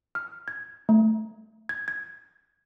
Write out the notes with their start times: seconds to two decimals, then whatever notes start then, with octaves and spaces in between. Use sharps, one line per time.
0.15 F6
0.48 G#6
0.89 A3
1.69 G#6
1.88 G#6